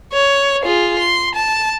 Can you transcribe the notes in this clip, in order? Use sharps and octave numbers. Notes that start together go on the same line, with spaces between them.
C#5
F4 G#4
C6
A5